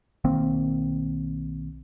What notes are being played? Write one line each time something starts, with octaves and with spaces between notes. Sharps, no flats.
B1 D#3 A#3 C4